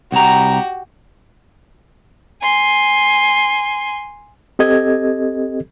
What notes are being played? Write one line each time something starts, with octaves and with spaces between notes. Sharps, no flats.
C2 F#4 G4 A#5
G#5 C6
C4 G4 A4 D#5 G#6